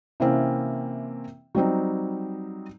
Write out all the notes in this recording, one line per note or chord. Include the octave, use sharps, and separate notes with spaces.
C3 E3 A#3 C4 C#4
F#3 G3 C4 D#4